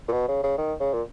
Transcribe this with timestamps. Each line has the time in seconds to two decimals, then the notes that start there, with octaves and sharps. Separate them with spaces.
0.08 A#2
0.13 B2
0.28 C#3
0.43 C#3
0.58 D#3
0.80 C#3
0.93 A#2